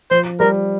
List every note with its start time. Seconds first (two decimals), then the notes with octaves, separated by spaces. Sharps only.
0.11 F3 C5
0.40 G3 A#4